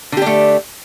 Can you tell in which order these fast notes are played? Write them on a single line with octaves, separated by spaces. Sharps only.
D3 G4 D4 A3